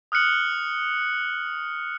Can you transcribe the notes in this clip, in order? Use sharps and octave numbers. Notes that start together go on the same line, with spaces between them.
D#6 F6 F#6 C#7 F#7